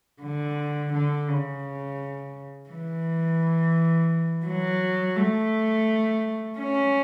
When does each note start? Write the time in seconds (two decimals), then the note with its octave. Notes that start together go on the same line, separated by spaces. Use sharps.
0.22 D3
0.93 D3
1.28 C#3
2.70 E3
4.46 F#3
5.16 A3
6.58 C#4